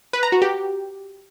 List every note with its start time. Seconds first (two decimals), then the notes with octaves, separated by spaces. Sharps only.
0.13 B4
0.23 A#5
0.32 F#4
0.42 G4